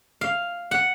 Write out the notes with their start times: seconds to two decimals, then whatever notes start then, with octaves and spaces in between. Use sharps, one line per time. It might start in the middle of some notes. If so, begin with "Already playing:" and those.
0.21 F5
0.71 F#5